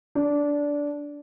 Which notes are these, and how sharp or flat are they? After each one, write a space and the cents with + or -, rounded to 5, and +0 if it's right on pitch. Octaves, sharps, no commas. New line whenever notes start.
D4 -15